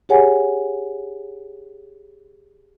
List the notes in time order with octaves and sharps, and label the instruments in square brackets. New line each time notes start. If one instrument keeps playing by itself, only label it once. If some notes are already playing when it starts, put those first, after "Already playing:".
[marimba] G4 G#4 C#5 F#5 G#5